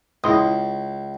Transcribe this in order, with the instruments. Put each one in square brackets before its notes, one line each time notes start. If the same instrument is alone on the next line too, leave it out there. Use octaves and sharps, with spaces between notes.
[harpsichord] C#2 [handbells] E4 C6 D#6